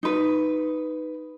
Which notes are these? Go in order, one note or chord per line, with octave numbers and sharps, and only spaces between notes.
D#4 B4